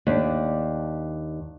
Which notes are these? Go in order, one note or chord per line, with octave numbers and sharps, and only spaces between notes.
D#2 D4